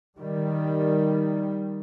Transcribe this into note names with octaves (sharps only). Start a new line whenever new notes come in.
D#3 G3